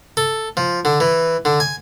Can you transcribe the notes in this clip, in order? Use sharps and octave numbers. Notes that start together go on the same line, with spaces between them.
A4
F3
D3
E3
D3
G#5